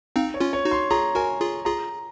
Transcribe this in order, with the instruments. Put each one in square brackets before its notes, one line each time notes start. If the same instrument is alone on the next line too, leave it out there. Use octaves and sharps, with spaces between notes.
[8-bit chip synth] C4 D#4 [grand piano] F5
[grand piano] C#5
[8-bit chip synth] C#4 F4
[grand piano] C#5
[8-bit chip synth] D#4 F#4
[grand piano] C6
[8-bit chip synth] F4 G#4 [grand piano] A#5
[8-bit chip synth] F#4 A#4 [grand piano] G#5
[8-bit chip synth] F4 G#4
[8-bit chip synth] F4 G#4 [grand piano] A#5